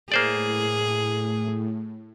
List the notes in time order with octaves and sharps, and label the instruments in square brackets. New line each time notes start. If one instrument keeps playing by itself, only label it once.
[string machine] A2 [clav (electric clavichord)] A#3 C5 D5 [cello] G#4